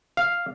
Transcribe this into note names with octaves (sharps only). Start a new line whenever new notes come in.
F5